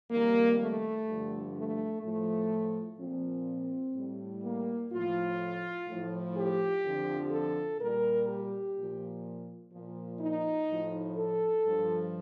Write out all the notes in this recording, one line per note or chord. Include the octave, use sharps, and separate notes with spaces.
F2 D#3 G3 A#3
A3
G2 D3 F3
A3
A2 F3 A3
A#2 F3 C4
A2 G3
A#3
A2 F3 F4
A2 F3
G4
F2 D3 F3
A4
A#2 G3 A#4
G4
A#2 F3
A#2 F3
D#4
A2 F3
A4
G2 F3